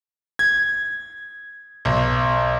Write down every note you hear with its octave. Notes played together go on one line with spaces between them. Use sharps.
G#6
B1